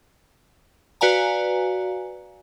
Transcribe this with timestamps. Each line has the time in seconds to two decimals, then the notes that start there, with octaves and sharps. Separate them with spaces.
1.01 F#4 B4 D5 F5 G#5 A#5